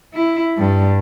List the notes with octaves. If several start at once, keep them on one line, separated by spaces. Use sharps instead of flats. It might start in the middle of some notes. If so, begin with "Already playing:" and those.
E4
G2